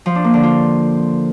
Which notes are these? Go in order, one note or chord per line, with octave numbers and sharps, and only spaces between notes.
F3
D4
A#3
D3
F4